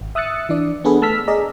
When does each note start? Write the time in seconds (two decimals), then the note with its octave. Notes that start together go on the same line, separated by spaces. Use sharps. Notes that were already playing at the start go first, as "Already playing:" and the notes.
0.01 G#1
0.15 E5 D#6 E6 F#6 A6 C#7
0.49 E3 D4 D5
0.85 B3 D4 G#4 A4 B4 F#5
1.02 A3 A5 E6 F6 B6
1.28 G#4 D5 D#5 A#5